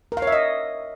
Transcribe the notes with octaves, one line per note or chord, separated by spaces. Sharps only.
A#4
F5
C#5
E5
D#5